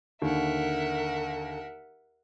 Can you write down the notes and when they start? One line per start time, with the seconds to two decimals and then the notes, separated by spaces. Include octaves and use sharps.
0.22 D#2 D3 A#4 E5 F#5